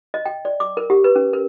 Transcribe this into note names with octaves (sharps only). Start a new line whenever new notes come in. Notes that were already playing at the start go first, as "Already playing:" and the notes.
D#5
G5
D5
D6
A#4
G4
B4
C#4
A#4